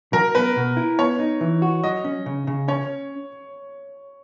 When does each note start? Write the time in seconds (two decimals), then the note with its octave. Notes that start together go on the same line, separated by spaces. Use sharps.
0.13 F#3 A#4
0.35 B3 B4
0.56 B2
0.77 E4
0.99 B3 C#5
1.19 D#4
1.41 E3
1.62 F#4
1.83 F#3 D#5
2.04 C#4
2.26 C#3
2.47 C#3
2.68 C#4 C#5